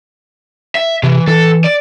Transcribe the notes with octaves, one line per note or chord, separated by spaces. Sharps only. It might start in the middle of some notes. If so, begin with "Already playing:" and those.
E5
C3 E3
E3 A4
D5